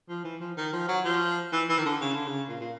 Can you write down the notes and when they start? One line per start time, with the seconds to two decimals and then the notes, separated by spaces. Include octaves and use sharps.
0.09 F3
0.24 E3
0.41 F3
0.57 D#3
0.73 F3
0.88 F#3
1.05 F3
1.52 E3
1.69 E3
1.78 D#3
1.85 D3
2.01 C#3
2.14 D3
2.27 C#3
2.49 A#2
2.60 A#2